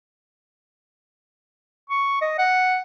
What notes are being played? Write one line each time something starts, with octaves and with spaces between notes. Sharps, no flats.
C#6
D#5
F#5